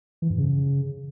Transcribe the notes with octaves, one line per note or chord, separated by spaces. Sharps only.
E3
G2
C#3